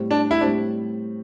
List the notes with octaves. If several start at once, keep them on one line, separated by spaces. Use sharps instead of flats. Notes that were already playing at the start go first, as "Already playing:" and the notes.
Already playing: A2 G3 C4
D4
E4
A2 G3 C4 D4